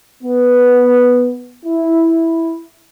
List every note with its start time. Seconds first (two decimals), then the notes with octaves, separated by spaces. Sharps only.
0.24 B3
1.64 E4